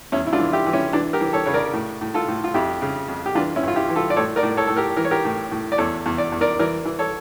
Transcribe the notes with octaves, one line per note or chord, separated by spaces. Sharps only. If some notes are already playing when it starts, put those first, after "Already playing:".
E2 C#4 E4
E4
D4 F4
E3
E4 G4
E3
C#4 E4
E3 D4
G4 A#4
E3
A4 C#5
C#3 C#5
A#4 D5
A2
A2
F4 A4
A2
F4
F2 E4 G4
C#3
F2
G4
E3 D4 F4
C#4 E4
G2 F4
E4 G4
E3
F4 A4
D5
A2 A4 C#5
A#4 D5
A2
A4 C#5
A2 A4
G4 A#4
E3 A#4
C#5
G4 A#4
A2
A2
D5
E2 A4 C#5
E2
D5
E2
A#4 D5
E3 A#4 D5
E3
A4 C#5